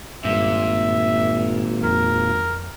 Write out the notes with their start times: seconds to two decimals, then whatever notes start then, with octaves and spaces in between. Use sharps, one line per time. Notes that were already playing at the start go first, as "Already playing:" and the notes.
0.25 G#1 G2 A#2 E5
1.84 F2 A#4